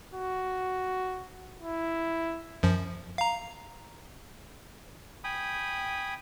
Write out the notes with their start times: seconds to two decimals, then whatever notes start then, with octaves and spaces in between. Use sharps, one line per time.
0.13 F#4
1.60 E4
2.63 F#2 F3
3.18 F5 A#5
5.24 G5 G#5 B5 D#6